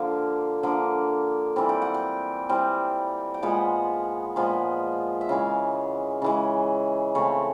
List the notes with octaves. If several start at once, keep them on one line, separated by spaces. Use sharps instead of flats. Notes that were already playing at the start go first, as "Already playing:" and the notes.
Already playing: D3 F3 A#3 F5
D3 F3 A#3
E3 G3 C4
G5
F#5
G5
E3 G3 C4
G5
A#2 F3 G#3 B3 F#5
A#2 F3 G#3 B3
E5
C#3 E3 G#3 F5
C#3 E3 G#3
C#3 E3 A3 C4 C#5